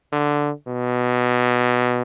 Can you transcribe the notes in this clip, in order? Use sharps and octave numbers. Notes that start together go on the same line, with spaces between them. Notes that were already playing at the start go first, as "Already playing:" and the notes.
D3
B2